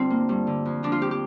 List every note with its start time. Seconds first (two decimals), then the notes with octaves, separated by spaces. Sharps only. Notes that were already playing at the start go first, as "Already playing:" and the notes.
Already playing: D2 G2 C4 D4 F4
0.10 A#3
0.29 G2
0.47 D3
0.65 F2
0.83 F3 D4
0.92 F4
1.01 F2 G4
1.11 G4